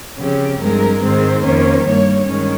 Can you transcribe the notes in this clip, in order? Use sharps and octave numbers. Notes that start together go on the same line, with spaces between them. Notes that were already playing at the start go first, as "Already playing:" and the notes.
C#3 F3 C4 G4
G2 F3 G#3 C4 A#4
G#2 D#3 G#3 C4 C5
F2 D#3 A#3 C#4
G2 G3 A#3 C#5
G2 D#3 G#3 C#4